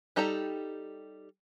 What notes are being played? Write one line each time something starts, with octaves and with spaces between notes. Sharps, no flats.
G3 D#4 G4 A4 A#5